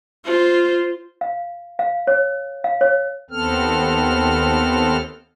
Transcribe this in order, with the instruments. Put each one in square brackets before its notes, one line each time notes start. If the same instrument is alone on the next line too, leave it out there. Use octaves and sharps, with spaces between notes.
[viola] F4 C5
[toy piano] F5
F5
C#5
F5
C#5
[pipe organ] D#2 B3 C4 A4 F6